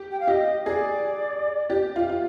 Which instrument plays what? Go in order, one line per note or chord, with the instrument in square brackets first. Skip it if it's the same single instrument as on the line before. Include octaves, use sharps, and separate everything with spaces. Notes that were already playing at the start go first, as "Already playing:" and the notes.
Already playing: [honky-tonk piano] G4
[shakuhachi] G5
F5
[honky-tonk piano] G4 [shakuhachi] D#5
[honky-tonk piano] G#4 [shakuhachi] D5
[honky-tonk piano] G4
F4
F4